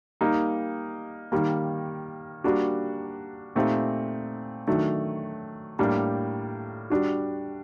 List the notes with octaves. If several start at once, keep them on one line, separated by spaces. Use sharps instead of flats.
G3 A#3 D#4
D#3 G3 A#3
G3 A#3 D4 F#4
A#2 A3 C4 D#4 G4
D#3 F#3 A3 D4
A2 G3 A#3 D4
G3 D4 F#4